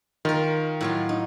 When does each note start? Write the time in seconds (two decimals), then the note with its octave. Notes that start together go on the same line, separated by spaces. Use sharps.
0.25 D#3 F4 A#4
0.81 A2 F#3 F4
1.09 D#4